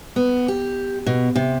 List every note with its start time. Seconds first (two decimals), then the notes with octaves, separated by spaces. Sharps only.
0.16 B3
0.48 G4
1.06 B2
1.36 C3